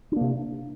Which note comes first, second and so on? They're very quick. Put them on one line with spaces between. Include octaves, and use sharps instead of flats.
D4 A#3 C3